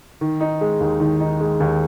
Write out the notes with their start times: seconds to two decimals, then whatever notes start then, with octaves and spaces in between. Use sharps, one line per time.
0.21 D#3
0.40 D#4
0.61 G#3
0.80 D#2
1.00 D#3
1.20 D#4
1.41 G#3
1.60 D#2